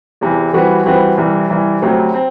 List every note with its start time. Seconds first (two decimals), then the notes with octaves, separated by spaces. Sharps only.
0.21 E2 C3 E3
0.53 E3 G3 C4 F#4 B4
0.86 E3 G3 C4 F#4 B4
1.18 C2 C3 E3
1.50 C2 C3 E3
1.82 D2 C3 F#3 C4
2.14 C4